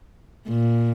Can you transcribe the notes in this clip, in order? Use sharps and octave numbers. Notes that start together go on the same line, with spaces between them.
A#2